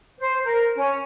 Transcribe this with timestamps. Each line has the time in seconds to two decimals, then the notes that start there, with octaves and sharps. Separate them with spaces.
0.18 C5
0.44 A#4
0.76 C#4